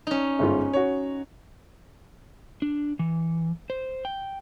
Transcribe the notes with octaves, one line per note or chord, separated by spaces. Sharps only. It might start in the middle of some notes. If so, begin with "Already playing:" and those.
C#4 D#4
G1 G#2 F4
F#4 C#5
D4
E3
C5
G5